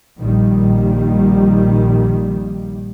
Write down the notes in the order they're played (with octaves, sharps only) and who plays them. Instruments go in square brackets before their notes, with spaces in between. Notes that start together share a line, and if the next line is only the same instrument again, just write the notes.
[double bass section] A#1 A#2 D#3 G3